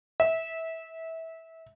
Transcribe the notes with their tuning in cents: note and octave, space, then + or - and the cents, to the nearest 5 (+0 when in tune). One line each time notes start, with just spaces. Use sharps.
E5 -20